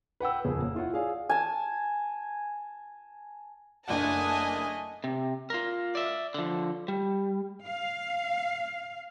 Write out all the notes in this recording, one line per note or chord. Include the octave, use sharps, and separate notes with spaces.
B4 F#5 G5 E6
D#1 F2 C#3 G#4
A#3 F#5
E4 F4 C#5 F#5
G#4 D5 F5 G#5
G#5 A5
F#1 A3 D4 D#5 F#5 G#5 A5 D#6
C3
F4 A#4
D5 E5
D3 F3
G3
F5